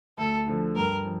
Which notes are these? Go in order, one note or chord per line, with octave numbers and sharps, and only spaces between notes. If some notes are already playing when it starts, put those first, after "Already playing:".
D2 A4
D3 F3
G2 A#4
F3